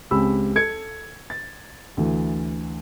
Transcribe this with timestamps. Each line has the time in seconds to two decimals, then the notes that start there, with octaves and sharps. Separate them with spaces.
0.11 C#2 C4 G4 B5 E6
0.56 A4 G#6 C#7
1.30 A6
1.97 D2 E3